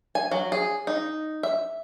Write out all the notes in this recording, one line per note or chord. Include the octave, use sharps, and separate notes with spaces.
G#5
F#3
G#4
D#4
E5